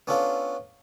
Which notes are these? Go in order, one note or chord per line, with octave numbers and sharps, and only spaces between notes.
B3 C#4 D4 F4 A4